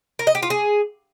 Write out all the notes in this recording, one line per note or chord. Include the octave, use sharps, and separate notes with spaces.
A#4
D#5
G4
F4
G#4